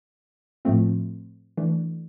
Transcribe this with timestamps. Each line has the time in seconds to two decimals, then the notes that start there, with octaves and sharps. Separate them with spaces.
0.65 A2 F3 A3 C4 F4
1.58 E3 A3 D4